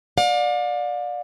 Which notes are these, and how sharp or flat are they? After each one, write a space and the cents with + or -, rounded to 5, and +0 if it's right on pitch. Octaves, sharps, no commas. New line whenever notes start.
D5 +10 F5 +40